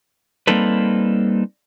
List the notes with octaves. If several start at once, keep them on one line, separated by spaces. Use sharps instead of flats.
G3 A#3 C4 D#4 A4 B4